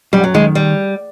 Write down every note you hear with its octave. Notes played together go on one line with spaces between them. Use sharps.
F#2 G3
F#3
D#3 G#3
G3